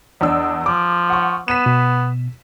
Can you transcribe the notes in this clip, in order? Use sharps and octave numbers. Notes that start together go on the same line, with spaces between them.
E2 D4 D#5 E6
F3 D6
F#5 C#6
B3 B6 D#7 E7
B2